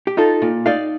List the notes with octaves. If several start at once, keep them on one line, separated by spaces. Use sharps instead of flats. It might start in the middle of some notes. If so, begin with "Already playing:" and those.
G4
D#4 F4 A4
A#2
D#4 D5 F5